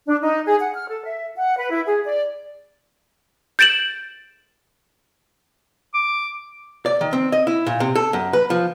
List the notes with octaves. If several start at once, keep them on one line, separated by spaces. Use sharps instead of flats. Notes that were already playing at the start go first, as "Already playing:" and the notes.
D4
D#4
G#4
F#5
F6
A4
E5
F#5
B4
E4
G#4
D5
G6 A6 D7 E7 F#7
D6
D5
D#3
C4
D#5
E4
A#2
C3
A4
F#2
B4
F3